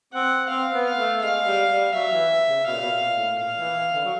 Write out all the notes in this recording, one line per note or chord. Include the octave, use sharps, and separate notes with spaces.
C4 F#5
C4 F5
B3
F5
A3
G#3 F5
G3
G3
F#3 E5
E3
C#3
B2 F5
A#2
B2
A#2
A2
A#2 F5
E3
E3
D3
F#3